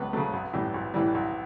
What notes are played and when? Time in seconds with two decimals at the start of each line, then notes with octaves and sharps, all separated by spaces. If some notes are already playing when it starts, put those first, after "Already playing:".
Already playing: C#2 F#3 B3 B4
0.13 C#3 F#3 A3
0.33 B1
0.53 A2 E3 G3
0.74 B1
0.94 A2 E3 G3
1.14 B1